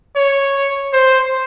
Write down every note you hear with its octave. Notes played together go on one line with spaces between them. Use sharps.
C#5
C5